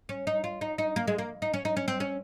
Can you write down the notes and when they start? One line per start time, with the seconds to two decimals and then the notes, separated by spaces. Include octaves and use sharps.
0.09 C#4
0.27 D#4
0.44 F4
0.61 D#4
0.78 D#4
0.96 A#3
1.07 G#3
1.18 A#3
1.42 D#4
1.54 C#4
1.65 D#4
1.77 C#4
1.88 C4
2.00 C#4